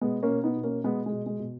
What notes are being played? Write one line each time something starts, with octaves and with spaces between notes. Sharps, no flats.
B2 G#3 B3
A#3 C#4
B2
B3 D#4
B2
A#3 C#4
B2 G#3 B3
G#3
B2
G#3
B2